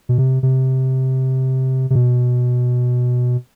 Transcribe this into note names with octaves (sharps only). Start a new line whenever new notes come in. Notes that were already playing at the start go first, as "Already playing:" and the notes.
B2
C3
C3
C3
B2